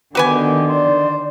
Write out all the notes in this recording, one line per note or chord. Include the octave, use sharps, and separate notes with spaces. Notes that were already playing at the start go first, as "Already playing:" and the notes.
D3 D#3 B3 F#4 G4 B4 G#5
C5 D5